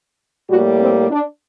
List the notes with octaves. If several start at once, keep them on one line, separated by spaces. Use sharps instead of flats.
A2 G3 A#3 F#4
C4
D4